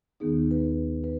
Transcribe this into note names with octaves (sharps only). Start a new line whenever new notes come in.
D#2 D#3 B3 D#4 G#4
B4
B4